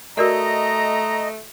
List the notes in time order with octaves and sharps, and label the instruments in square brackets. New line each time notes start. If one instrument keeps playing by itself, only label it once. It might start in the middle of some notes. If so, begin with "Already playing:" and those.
[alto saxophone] A3 [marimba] F#4 A#4 D5 [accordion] D#5 [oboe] A#5